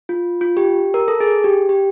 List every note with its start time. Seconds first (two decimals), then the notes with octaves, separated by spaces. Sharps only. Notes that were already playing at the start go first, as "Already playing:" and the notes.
0.09 F4
0.41 F4
0.57 G4
0.94 A#4
1.08 A4
1.20 G#4
1.44 G4
1.69 G4